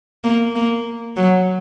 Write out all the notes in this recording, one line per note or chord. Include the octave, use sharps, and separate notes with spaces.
A#3
A#3
F#3